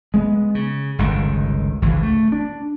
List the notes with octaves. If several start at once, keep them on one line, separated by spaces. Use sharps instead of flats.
G#3 B3
C#3
G1 C#2 C3 D#3
G#1 C#2 D3 E3
A3
D4